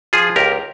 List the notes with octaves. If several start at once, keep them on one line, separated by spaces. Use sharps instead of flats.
F3 F4 G#4
C#2 G4 A#4